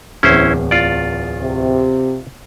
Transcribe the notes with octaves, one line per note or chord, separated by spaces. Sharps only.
D1 E2 C#4 E4 C5
F4 D5
C3